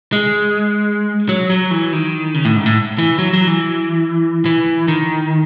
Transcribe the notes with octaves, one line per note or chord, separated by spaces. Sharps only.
G#3
F#3
F#3
E3
D#3
C#3
A2
G#2
A2
E3
F#3
F#3
E3
E3
D#3